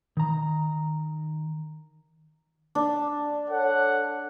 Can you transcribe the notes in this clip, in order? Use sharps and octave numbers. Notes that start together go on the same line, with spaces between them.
D#3 A#5
D4
A4 C#5 F#5